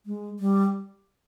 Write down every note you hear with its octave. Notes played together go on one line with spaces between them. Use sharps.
G#3
G3